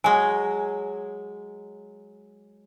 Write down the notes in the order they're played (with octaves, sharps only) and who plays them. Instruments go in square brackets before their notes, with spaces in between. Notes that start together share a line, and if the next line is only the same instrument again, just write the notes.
[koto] F#3 G#3 [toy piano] G#5